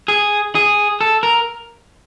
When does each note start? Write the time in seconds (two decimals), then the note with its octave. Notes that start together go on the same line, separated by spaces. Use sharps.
0.08 G#4
0.55 G#4
1.01 A4
1.23 A#4